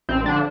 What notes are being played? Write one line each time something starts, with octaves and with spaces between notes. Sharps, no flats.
A1 C4
D3 F3 D4